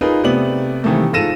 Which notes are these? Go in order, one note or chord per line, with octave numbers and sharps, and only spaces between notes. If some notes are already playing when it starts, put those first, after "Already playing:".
D#4 F4 G#4 A#4 B4
C3 A3 B3 D5 F#7
C3 D#3 E3 G3 A3 A#3
G#2 F4 A4 A#6 D#7 E7